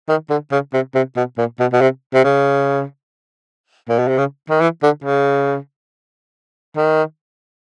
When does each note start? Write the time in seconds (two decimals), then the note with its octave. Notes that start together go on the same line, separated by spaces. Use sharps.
0.09 D#3
0.30 D3
0.52 C#3
0.74 C3
0.95 C3
1.16 B2
1.38 A#2
1.60 B2
1.73 B2
1.81 C3
2.14 C3
2.24 C#3
3.89 A#2
3.99 B2
4.08 C3
4.18 C#3
4.50 D#3
4.61 E3
4.83 D3
5.04 C#3
6.77 D#3